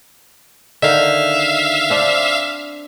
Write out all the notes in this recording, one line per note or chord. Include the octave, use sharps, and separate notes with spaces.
D3 D#3 D#4 E5 F5
C4 D4